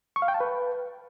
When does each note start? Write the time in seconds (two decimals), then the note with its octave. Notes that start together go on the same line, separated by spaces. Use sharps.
0.16 C#6
0.22 F5
0.28 G5
0.34 A5
0.40 B4